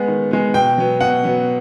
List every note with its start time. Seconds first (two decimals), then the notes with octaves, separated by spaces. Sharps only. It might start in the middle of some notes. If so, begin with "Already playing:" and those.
Already playing: G#3 B3 F#5
0.08 D#3
0.31 G#3 B3
0.54 B2 G5
0.78 F#3 B3
1.01 B2 F#5
1.24 F#3 B3